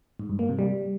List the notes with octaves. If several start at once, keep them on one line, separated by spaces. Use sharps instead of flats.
G#2
G2
A#3
C3
G3